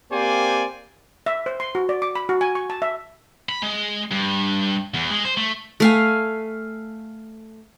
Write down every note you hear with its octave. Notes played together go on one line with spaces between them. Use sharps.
A#3 C4 G4 C5 D5 G#5
E5
C5
C6
F#4
D5
D6
B5
F#4
G#5
C#6
A5
E5
B5
G#3
G2
E2
G#3
C5
A3
A3 F5 G#5